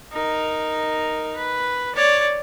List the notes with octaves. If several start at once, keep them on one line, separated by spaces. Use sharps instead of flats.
D#4 A#4
B4
C#5 D5